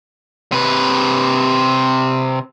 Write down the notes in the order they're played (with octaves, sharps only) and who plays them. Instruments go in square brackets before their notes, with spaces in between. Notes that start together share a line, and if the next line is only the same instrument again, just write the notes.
[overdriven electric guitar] C3 B4